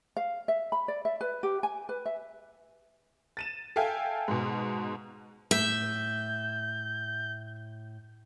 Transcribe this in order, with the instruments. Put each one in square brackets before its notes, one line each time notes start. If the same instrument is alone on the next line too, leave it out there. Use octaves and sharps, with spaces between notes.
[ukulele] F5
E5
B5
D5
E5
B4
G4
G#5
B4
E5
[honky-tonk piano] A6 D#7 E7
A4 E5 F5 G5 G#5
G#2 B2
[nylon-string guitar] A2 [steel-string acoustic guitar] E5 [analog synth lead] G6